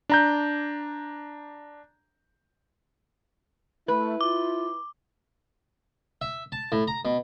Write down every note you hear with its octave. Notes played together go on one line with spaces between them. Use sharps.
D4 A#5 G6
A3 E4 B4
F4 D6
E5
A5
A2
A#5
B2